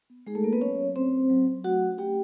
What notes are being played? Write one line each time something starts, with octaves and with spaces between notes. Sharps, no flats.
B3
G#3 D#4 G#4
A3 A4
A#3 F#4 A#4
B3 B4
F#3 C#4 C#5
F#3
A3 C4 C5
C#4
F#3
F#3
A3 F#4 F#5
C#4
A3 G4 G5